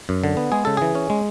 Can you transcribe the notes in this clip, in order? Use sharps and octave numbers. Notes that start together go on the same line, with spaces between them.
F#2
D3
B3
G#3 G#4
C#3 A4
E3 G#4
C#4
G#3